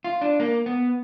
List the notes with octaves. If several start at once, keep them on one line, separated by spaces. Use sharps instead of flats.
F4
D4
A#3
B3